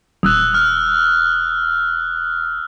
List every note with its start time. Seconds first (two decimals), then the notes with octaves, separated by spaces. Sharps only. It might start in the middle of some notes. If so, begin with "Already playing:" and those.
0.23 D#1 D#6 E6 F#6
0.54 F6